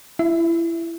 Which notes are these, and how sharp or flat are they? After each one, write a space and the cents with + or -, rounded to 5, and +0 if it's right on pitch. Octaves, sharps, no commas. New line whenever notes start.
E4 +25 E5 +0